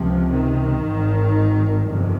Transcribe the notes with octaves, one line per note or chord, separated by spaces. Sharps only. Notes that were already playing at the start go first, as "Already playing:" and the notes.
Already playing: C#2 C3 F3
D#3
G#1 G#2
G1 F2 C3